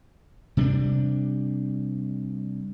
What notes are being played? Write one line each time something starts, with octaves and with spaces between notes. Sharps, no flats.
C3 G3 C#4 D4